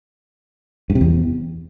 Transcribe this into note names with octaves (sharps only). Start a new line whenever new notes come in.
G2
C3
E2